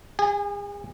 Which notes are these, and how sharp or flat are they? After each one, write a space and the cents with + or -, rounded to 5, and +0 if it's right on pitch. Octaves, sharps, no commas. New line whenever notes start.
G#4 -40 G#5 +0